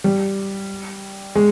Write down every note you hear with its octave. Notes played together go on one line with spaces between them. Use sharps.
G3
G#3